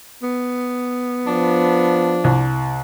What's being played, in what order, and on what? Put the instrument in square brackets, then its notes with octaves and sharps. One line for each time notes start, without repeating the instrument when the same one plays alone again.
[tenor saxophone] B3
[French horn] F3 [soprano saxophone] D4
[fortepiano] C2